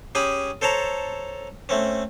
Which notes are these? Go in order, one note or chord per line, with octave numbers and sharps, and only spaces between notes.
C#4 G4 G#4 G#5 B5
A4 C5 C#5 A5 A#5
A3 C4 C#4